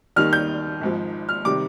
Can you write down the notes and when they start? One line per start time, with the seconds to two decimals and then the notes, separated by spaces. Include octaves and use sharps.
0.16 D#2 D#3 G3 F6
0.33 G6
0.81 G#1 G#2 F3
1.29 F6
1.45 C3 D#3 G3 D6